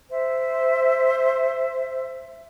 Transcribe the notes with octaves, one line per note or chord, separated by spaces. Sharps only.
C5 E5